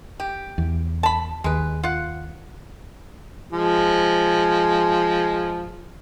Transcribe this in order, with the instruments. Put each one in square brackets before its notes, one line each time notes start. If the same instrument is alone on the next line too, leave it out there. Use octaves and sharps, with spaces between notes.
[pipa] G4
[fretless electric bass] E2
[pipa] A5 B5
[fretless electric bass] D#2 [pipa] G#3 B4
[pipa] F4 F#5
[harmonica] F3 G#3